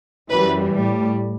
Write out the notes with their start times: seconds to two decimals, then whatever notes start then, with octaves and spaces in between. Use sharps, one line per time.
0.30 F#2 E3 G3 B4
0.72 A2 G3